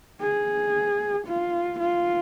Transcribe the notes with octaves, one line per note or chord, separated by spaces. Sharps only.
G#4
F4
F4